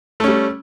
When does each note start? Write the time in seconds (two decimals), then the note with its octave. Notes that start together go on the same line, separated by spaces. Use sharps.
0.20 A3
0.24 C#4
0.28 G3